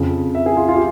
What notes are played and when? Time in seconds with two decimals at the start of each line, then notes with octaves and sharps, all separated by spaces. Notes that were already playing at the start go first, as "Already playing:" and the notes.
Already playing: F2 C#3 F3
0.35 E5
0.46 G#4
0.57 F4
0.69 F4
0.76 G4